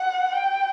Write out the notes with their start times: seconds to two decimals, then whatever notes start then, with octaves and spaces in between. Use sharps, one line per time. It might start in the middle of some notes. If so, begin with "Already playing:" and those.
Already playing: F#5
0.32 G5